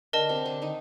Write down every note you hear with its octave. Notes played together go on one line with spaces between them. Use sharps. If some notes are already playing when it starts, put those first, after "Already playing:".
D3 D4 A#4 D#5 A5
C3 C4
D3 D4
D#3 D#4